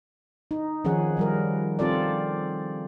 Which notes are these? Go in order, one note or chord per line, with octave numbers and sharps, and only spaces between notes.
D#4
D#3 F3 C#4 G#4 F#5
F3 G3 A#4
C4 F4 A4 D5